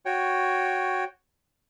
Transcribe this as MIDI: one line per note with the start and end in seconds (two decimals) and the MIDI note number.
0.06 1.04 66
0.06 1.04 73
0.06 1.04 79